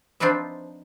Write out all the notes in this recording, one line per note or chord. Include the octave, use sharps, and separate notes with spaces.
F3 C4 D4 D#4 B4 E5